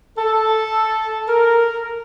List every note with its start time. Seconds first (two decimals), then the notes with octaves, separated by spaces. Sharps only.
0.18 A4
1.29 A#4